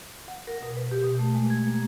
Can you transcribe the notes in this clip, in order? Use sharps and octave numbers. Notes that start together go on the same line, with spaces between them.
F#5
A#4
B2
B4
G4
B2
A3
G#3
G#6
A#3